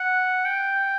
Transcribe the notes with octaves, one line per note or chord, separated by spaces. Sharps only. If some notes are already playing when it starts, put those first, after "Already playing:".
Already playing: F#5
G5